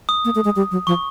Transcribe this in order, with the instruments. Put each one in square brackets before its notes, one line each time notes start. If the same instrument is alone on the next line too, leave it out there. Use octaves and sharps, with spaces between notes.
[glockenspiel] D#6
[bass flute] A#3
A3
G#3
G3
F#3
[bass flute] F3 [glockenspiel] C#6